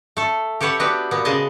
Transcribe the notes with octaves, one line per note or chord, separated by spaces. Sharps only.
A3 A4
G4 A4 B4 C#5 F#5
B3 D4 F#4 G4 B4
A#2 B3
C#3 G#3 G#4 D#5 A5